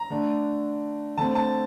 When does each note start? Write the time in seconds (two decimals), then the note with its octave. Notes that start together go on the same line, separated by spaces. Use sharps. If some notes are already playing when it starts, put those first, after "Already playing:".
Already playing: A#5
0.10 D3 A3 D4
1.18 D3 A3 C4 A5
1.35 A5